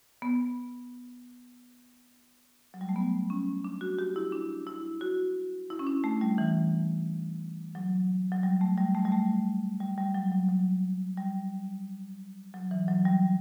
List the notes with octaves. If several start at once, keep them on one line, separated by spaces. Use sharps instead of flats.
B3
F#3
G3
A3
B3
C#4
D4
F#4
G4
E4
D4
E4
F#4
E4
C#4
D4
A3
G3
E3
F#3
F#3
G3
A3
G3
A3
G3
A3
G3
G3
F#3
F#3
F#3
G3
F#3
E3
F#3
G3